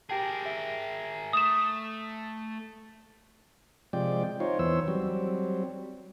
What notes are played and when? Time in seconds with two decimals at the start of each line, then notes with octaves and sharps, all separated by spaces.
0.10 G4 G#4 A#4 G5 A5
0.46 E5
1.33 A3 D#6 E7
3.93 C3 F3 G#3 D5 G5
4.40 D#4 F4 C5 C#5
4.59 E2 E3 C5 C#5 E6
4.88 F#3 G3 C4